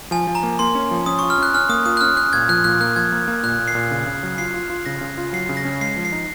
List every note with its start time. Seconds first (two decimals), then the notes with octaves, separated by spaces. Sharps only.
0.11 F3 G#5
0.27 F3
0.35 A#5
0.43 A#3
0.59 A#3 C6
0.75 C#4
0.91 F3
1.06 C#4 D#6
1.19 F4 C#6
1.30 F6
1.38 C#4 F#6
1.54 C#4 F6
1.69 A#3 D#6
1.85 F4 D#6
1.97 F#6
2.01 C#4 F6
2.17 C#4 F#6
2.33 A#2 G#6
2.49 F3 F#6
2.64 A#2 F#6
2.81 A#3 F#6
2.96 F3 G#6
3.12 A#3
3.28 A#3
3.43 A#2 F#6
3.59 A#2
3.68 C7
3.75 A#2
3.91 C#3
4.07 C#3
4.23 F#3
4.38 F4 C7
4.54 F4
4.70 F4
4.86 C#3 A#6
5.01 C#3
5.18 F4
5.33 F#3 C7
5.49 C#3
5.57 A#6
5.65 C#4
5.81 G#3 C7
5.96 F3
6.05 C7
6.12 D#4